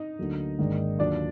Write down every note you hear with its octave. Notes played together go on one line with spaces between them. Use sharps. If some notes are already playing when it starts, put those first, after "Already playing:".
Already playing: D#4 D#5
D2 D3 F#3 A#3
G#1 G#2 D#3 A#3 D4
D#2 D3 F#3 A#3 D4 F4 D5